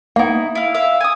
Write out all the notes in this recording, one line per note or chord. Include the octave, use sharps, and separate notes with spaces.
A#3 B3 D#4 E4
E4 F5
E5 F5
G#5 D#6